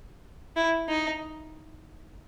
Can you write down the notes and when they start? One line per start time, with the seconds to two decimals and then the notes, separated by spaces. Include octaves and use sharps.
0.56 E4
0.89 D#4